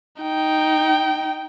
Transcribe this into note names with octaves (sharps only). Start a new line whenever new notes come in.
D#4 G5